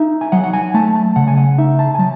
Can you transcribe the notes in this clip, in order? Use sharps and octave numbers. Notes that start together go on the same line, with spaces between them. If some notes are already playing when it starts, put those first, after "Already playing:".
Already playing: D#4 E5
G#5
F#3 F#5
F#5
G#5
A3 A5
A5
C#3 F#5
G#5
F#5
D#4 E5
A5
G#5
F#3 A5